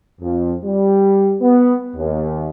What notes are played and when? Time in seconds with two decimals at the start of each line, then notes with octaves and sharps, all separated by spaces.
0.20 F2
0.63 G3
1.40 B3
1.95 D#2